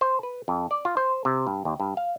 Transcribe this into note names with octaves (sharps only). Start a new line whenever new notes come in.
C5
B4
F2
D5
F4
C5
C3
G2
D#2
G2
F5